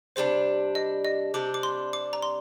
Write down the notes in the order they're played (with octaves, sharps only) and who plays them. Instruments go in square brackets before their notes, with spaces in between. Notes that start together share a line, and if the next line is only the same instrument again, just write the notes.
[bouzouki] C3 G3 D4 [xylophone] C5
[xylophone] D#5
D#5
[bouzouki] C3 G3 D4 [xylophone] D6
[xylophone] D6
C6
D6
A#5
C6